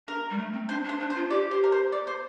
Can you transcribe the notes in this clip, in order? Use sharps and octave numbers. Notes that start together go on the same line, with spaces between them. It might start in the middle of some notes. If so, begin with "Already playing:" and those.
D4 A#4
G3
A3
C4
D4 C5
D4
C5
D4
C5
F4
G4 D5
C5
A#4
C5
D5
C5